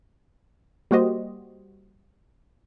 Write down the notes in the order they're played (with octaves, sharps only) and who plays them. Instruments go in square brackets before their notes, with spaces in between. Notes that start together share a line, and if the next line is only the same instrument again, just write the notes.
[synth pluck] G3 A#3 F#4 G4 C5 D#5